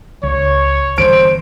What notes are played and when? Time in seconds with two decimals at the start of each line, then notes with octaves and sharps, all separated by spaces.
0.23 C#2 C#5
0.98 G1 E3 C5 D7